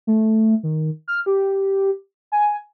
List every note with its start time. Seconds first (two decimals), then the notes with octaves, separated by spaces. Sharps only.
0.07 A3
0.63 D#3
1.08 F6
1.26 G4
2.32 G#5